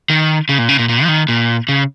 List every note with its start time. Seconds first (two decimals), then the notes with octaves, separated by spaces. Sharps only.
0.10 D#3
0.49 C#3
0.59 A#2
0.69 C#3
0.79 A#2
0.89 A#2
1.04 F3
1.08 D#3
1.28 A#2
1.69 C#3